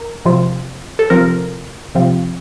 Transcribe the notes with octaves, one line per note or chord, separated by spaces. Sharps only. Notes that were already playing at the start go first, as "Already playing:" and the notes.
Already playing: A#4
C3 F3 C4 F4
A4
C3 F3 C4 F4 A#4
C3 F3 C4 F4